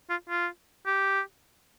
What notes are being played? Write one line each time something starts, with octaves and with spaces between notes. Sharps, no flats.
F4
F4
G4